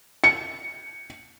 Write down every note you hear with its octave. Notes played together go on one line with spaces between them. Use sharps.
C#7